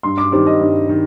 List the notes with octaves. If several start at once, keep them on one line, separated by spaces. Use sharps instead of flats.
G2 C6
D6
D#3 G3 C4 D6
D#5
G2
D#3